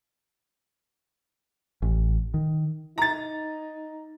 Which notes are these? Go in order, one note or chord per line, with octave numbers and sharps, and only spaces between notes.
A1
D#3
D#4 A#5 A6